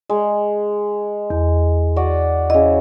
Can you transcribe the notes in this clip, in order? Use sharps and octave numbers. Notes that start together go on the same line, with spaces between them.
G#3
E2
F#4 D5 D#5
C#3 E4 D#5